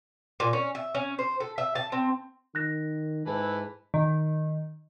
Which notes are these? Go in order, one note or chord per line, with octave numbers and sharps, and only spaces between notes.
A#2
C#4
E5
C#4
C5
A4
E5
A5
C4
D#3 F#6 A#6
G#2 E3 A4 B4
D#3